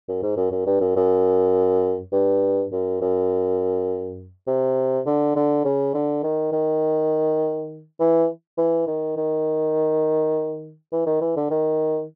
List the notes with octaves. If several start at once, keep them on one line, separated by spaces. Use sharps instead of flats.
F#2
G#2
F#2
F#2
G2
F#2
F#2
G2
F#2
F#2
C3
D3
D3
C#3
D3
D#3
D#3
E3
E3
D#3
D#3
E3
D#3
E3
D3
D#3